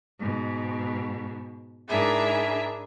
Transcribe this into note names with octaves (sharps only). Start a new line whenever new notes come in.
G#2 B2
G#2 D4 E4 G#4 A#4 E5